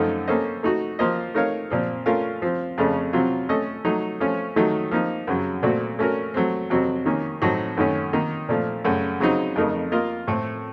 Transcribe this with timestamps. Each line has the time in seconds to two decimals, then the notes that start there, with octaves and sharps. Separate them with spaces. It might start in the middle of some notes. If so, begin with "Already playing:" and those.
Already playing: F#2 F3 A3 D#4 A4
0.27 A#3 C#4 A4 C5 D#5
0.63 A3 D#4 F#4
0.99 F3 A#3 F4 C5 D#5
1.34 A3 D#4 A#4 C#5 F5
1.70 A#2 F3 C4
2.06 A3 C#4 F4 A#4 F5
2.42 F3 C4 F4
2.78 F2 C#3 A3 C#4
3.13 C3 F#3 C4 F4
3.49 A3 C#4 A4 D#5
3.85 F#3 A3 D#4
4.20 F3 A3 C#4
4.56 D#3 F#3 A3 D#4
4.91 F3 A#3 D#4
5.27 F#2 C#3 F#3
5.63 A#2 A3 C4 F#4
5.99 A3 C#4 F#4 A#4
6.34 F#3 A3 C4
6.70 F2 C3 F#3 C4 F#4
7.06 D#3 A#3 C#4
7.41 A2 F#3 C4 D#4 F#4
7.77 F#2 D#3 A3 C#4
8.13 D#3 A#3 D#4
8.49 A#2 F3 A3
8.84 F#2 C#3 A3
9.20 C#3 F#3 C4 D#4
9.56 F2 C#3 A3 D#4 A#4
9.92 A#3 F4 A#4 D#5
10.28 A2 A3 C4